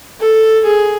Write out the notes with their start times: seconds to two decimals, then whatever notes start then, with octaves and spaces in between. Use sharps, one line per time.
0.20 A4
0.64 G#4